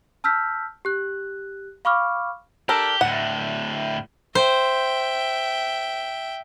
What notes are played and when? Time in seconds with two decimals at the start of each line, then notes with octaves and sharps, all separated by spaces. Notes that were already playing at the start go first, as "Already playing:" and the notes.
0.24 A5 E6 F6 G6 B6
0.85 G4 F#6
1.85 F5 B5 C#6 D6 F6
2.69 D4 G4 A4 A#4
3.01 D2 A2 F#5
4.35 C5 E5 G5